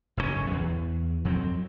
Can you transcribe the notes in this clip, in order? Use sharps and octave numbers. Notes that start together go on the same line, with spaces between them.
F#1 G#2 C3 C#4
E2
F2 F#3 B3 C4